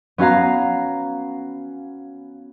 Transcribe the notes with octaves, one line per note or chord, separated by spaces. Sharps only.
B3 C#4 F#4 F5 A#5